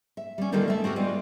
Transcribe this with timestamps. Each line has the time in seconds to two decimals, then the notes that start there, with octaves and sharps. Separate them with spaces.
0.17 E5
0.38 G3 C#4
0.52 D3 D#3 G3 A#3 F4 A4
0.68 A3 E5
0.84 C4 F#4 G4 A#4
0.96 G3 G#3 B3 F4